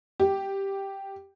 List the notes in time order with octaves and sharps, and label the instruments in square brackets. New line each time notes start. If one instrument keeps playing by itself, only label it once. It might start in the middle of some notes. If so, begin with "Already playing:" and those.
[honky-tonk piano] G4